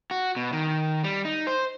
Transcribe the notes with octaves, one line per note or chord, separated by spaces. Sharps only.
F#4
B2
D#3
G3
D#4
C5